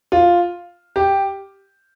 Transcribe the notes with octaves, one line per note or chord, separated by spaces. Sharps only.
F4
G4